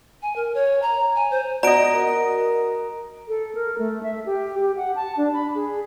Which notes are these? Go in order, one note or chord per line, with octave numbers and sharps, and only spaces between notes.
G#5
A#4
C#5
A#5
G#5
C5
B3 F#4 D5 D#5 A#5 D7
A#4
A4
A#4
A3
E5
G4
G4
F#5
A5
D4
B5
G#4